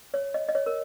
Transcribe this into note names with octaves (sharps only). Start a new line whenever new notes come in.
C#5
D#5
D#5
C#5
A#4